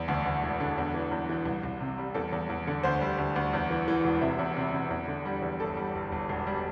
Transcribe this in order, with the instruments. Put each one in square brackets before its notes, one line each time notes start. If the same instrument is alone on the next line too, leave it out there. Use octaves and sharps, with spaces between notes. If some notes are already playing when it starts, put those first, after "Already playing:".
Already playing: [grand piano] E2
D2
D2
E1
D3
E2
E3
E2
E3
C2
C2
C3
G3
E2 A4
E2
E2
D3
D2 C5
G3
D2
D2
E2
E3
E3
E1
C3 E5
E2
C3
C3
E2
D3
G3
E2
G1 A4
G3
G1
G1
E1
G3